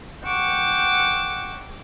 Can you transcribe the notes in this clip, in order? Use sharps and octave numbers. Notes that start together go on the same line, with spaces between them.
F#5 G5 C#6 D6 E6